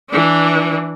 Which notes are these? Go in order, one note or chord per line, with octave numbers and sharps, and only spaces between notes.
E3 D4